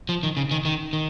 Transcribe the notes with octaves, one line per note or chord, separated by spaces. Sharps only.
F3
D#3
C#3
D#3
D#3
D#3